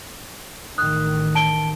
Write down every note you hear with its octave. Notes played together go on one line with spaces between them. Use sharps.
A1 D#3 D#6 F#6
A5 D7 G7